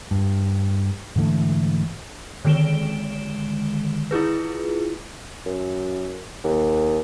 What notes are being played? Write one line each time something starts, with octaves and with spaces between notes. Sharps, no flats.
G2
G#2 D3 E3 A3
D3 D#3 G#3 D7 E7 G7
E4 F4 G#4 B4
F#2
D#2